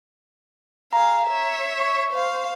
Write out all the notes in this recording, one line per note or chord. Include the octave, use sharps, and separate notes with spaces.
G#4 F5 A#5
C#5 E5
C#6
C5 F5